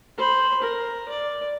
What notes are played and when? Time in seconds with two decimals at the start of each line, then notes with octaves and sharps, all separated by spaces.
0.17 C5 B5
0.62 A#4
1.09 D5